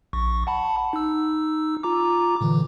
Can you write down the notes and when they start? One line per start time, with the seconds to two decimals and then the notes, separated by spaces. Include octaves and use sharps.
0.13 A#1 C#6
0.47 F#5 A5 B5
0.93 D#4 E6
1.83 F4 A#5 D6
2.41 A#2 D3 E3